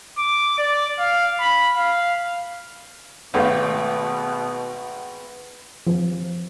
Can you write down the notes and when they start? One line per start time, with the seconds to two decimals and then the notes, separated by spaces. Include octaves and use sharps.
0.18 D6
0.58 D5
0.99 F5
1.40 B5
1.76 F5
3.34 G#1 B2 A3 B3 F5 G5
5.87 F3